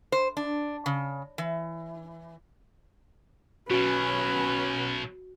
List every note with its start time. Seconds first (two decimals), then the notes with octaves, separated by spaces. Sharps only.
0.12 C5
0.37 D4
0.86 C#3
1.38 E3
3.71 B2 F#3 C#4 F#4 B4